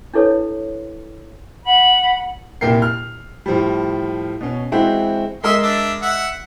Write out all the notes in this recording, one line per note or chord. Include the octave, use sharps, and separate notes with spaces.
D4 E4 A4 B4 C#5
F#5 B5
C2 A#2 A#4 G5 C7
F6
A2 F3 G3
B2 C#4
E3 G#3 C4 E4 F#4 C5
G#3 A#4 D#5 E5 C6
D4 E5
E5 F#5